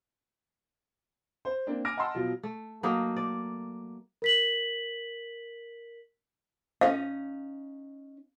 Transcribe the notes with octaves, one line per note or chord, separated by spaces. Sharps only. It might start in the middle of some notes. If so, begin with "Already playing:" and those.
C5
A#3 C4 D4
G#5 D6 F6 A#6 D7
D#5 F#5 A5 A#5 C6 E6
B2 F3 F#3 F4
A3
F#3 A3 A#3 D#4
D5
A#4 B6 F#7
C#4 D#4 F5